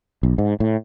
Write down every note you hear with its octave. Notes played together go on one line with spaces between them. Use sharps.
B1
G#2
A2